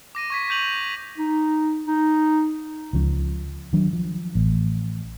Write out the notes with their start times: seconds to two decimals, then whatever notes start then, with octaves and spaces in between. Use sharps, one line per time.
0.15 D6 A#6 D#7
0.30 C#6 G#6 B6
0.49 C#6 G6 D#7 F7 F#7
1.18 D#4
1.87 D#4
2.93 C#2 F3 C#4
3.73 D#3 F#3 D4
3.93 F3
4.35 A1